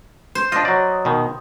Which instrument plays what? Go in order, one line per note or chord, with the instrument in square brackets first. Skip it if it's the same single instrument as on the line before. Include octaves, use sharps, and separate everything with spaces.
[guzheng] C5
[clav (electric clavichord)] D4 F4 [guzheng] D#5
[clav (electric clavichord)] F#3 D5
B2 D#3